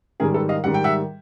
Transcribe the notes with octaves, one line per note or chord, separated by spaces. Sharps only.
G#2 D#3 G3 G#4 A#4
A4 B4
D#5 F5
G#2 D#3 G3 F#5
G5
E5 F#5